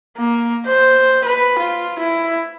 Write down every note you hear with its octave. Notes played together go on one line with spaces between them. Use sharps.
A#3
C5
B4
F4
E4